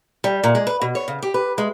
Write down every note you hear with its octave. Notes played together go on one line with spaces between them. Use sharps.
G3
A#2
G#3
B4
B2
C#5
C#3
G4
B4
G#3